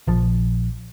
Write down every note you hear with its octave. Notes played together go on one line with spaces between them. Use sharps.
A#1 F3